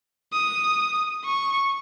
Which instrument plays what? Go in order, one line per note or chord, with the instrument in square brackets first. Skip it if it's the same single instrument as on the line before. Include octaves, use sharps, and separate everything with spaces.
[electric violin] D#6
C#6